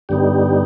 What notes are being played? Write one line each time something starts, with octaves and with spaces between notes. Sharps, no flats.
G2 D3 G3 B3 D#4 G4